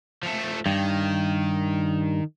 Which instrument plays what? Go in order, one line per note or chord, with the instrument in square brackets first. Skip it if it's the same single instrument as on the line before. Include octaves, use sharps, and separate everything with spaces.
[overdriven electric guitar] F3 A3
[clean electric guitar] G2 [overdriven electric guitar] D#3